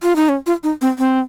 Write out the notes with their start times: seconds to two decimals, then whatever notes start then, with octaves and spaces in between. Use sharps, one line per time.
0.03 F4
0.16 D#4
0.29 C#4
0.46 F4
0.63 D#4
0.81 C4
0.99 C4